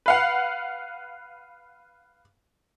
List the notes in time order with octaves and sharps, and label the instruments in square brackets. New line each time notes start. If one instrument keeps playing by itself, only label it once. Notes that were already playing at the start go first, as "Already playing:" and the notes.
[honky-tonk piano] B4 F5 F#5